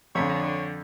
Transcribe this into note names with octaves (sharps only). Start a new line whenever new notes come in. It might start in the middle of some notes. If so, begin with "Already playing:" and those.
F2 D3 C#5